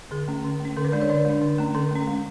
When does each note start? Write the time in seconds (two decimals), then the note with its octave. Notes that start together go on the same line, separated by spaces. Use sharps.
0.11 D3 G#4
0.28 A3 C#4
0.44 D3
0.60 A3
0.65 C#4
0.77 D3 A4
0.85 B4
0.92 G#3 D4 D5
1.01 C#5
1.09 D3 D5
1.25 G#3 D4
1.42 D3
1.58 A3 C#4
1.75 D3 A4
1.91 A3 C#4
2.08 G#3